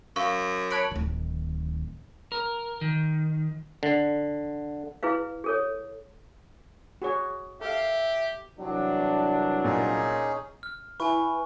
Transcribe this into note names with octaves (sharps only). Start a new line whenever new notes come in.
F#2 F5 C#6
C#5 A5 B5 F#6 D7
D1 D#3
A#4
D#3
D3
E4 G#4 B4 F5
G#4 A4 C#5
F#4 G#4 C#5
G4 A4 E5 F5
C2 E3 F#3 C4 D4
A#2 C#4 D#4 G#4
F6
E4 B4 G#5 C#6